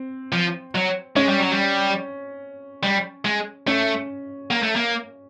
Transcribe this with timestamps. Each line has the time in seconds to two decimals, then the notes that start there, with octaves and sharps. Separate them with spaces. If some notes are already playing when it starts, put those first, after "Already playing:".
Already playing: C4
0.32 F3
0.75 F#3
1.16 G#3 C#4
1.29 G3
1.40 F#3
1.52 G3
2.83 G3
3.25 G#3
3.67 A3 C#4
4.51 A#3
4.63 A3
4.76 A#3